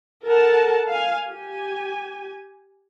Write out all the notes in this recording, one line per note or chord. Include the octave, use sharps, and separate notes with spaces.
A4 A#4 F#5 A5
F5 G#5
G4 G#5